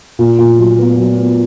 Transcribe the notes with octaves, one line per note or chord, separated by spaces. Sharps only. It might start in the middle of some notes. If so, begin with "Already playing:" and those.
A#2
A#2
F#3
B3
F#3
B3